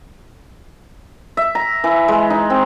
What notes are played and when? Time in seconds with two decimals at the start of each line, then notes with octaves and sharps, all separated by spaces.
1.37 E5
1.55 A#5
1.84 E3
2.08 G#3
2.30 D#4
2.50 C4